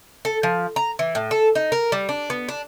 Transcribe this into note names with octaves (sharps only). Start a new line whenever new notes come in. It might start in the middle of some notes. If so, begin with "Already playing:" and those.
A4
F3
A#5
E3
A2
A4
D#4
A#4
G3
D4
B3
D4